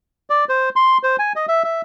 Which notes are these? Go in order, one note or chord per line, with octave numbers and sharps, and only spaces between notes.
D5
C5
C6
C5
G#5
D#5
E5
E5